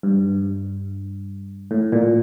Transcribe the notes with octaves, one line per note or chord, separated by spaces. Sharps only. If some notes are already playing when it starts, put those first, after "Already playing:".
G2
A2
A#2